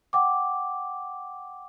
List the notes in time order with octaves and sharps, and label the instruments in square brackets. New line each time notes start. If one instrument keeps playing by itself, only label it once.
[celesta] F#5 G5 D6